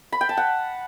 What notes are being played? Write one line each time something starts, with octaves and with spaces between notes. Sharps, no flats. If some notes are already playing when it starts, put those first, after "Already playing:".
B5
G5
A5
F#5